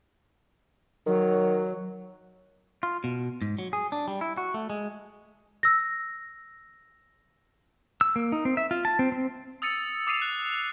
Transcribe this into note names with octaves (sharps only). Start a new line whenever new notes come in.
D#3 F#3
F4
B2
G#2
F#3
G#4
D4
G3
E4
F#4
A3
G#3
E6 A#6
E6
A#3
D#4
C4
E5
F4
A5
C4
C4
D#6 E6 A6 C#7 D#7
D6 D#6 C7 D#7 F7
F#6